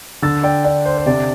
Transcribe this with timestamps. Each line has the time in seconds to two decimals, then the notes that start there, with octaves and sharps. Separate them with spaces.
0.22 D3 E6 A6
0.44 D5 G5
0.64 D4 D5
0.86 C5
0.98 C5
1.06 C3 D5